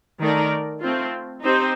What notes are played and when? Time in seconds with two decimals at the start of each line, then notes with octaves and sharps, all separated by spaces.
0.19 D#3 A3 D#4 A#4 D5
0.81 A3 C4 F4
1.43 C4 D#4 G4 C5